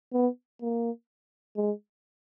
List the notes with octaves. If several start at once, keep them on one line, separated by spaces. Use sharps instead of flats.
B3
A#3
G#3